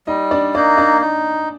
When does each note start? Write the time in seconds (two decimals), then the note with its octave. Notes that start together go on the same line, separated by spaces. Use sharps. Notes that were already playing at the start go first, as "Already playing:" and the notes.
0.07 G3 D#4 D#5
0.31 D4 D5
0.55 A#3 D4 D#4 D5
0.78 D4 D5
1.01 D#4